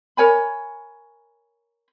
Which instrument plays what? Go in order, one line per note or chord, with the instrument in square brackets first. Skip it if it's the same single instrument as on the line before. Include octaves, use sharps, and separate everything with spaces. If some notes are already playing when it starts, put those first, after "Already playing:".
[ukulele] A#4 C#5 G#5 B5